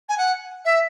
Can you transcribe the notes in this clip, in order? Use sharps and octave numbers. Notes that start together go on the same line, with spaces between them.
G#5
F#5
E5